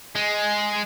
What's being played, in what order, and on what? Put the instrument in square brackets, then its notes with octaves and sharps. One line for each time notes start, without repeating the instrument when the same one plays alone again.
[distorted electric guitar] G#3